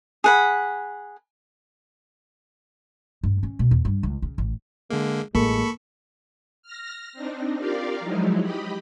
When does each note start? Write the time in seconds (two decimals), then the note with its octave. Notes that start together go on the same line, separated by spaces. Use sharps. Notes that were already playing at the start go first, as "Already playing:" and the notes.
0.24 G#4 F#5 B5
3.23 G2
3.43 C#4
3.59 B2
3.71 E2
3.85 G2
4.03 C#2
4.22 C#3
4.38 A1
4.90 D3 G#3 A#3
5.35 A1 G#3 A#3 A4 B5 C#6
6.63 F6 A#6
7.13 C4 D4 D#4
7.57 F4 G4 A#4 D5 F5
8.00 F3 F#3 G#3 D#4 E4
8.42 G4 D#5 B5